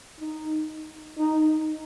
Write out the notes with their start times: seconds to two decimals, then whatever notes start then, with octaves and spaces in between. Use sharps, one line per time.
0.20 D#4
1.19 D#4